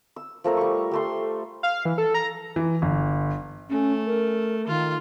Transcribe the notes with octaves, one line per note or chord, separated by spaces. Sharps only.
E6
F3 A3 A#4 E6
G3 C#6
G3 A3 C6
F5
E3
A4
A#5
E3
G1
A3 C#4
A#4
D#3 F4